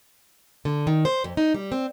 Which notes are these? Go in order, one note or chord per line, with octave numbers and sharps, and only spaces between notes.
D3
D#3
C5
F2
D#4
G3
C4